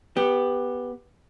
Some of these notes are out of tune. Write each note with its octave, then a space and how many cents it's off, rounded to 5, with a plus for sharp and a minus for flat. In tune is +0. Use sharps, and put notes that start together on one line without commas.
B3 -5 G4 +15